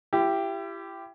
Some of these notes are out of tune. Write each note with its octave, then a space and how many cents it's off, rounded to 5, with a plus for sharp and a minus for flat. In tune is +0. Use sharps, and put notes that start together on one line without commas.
E4 +35 G4 +0